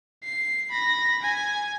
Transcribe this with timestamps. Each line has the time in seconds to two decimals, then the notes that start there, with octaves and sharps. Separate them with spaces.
0.23 C7
0.70 B5 A#6
1.21 G#5